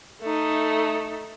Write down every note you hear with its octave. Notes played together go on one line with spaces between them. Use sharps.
A3 D#4